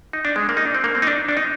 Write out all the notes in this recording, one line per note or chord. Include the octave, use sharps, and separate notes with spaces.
D#4
D4
G#3
A#3
D#4
D4
C4
A#3
C4
D#4
D4
D4
D#4